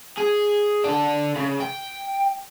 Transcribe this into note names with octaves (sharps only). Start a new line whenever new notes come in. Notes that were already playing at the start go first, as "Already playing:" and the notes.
G#4
D4 A4
C#3
G5